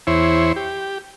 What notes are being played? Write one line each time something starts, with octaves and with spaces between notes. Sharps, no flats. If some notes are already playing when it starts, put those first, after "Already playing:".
E2 E4 C5 C#5
G4